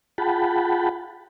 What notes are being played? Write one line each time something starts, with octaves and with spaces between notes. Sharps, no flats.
F4 G#4 F#5 G5 A5 B5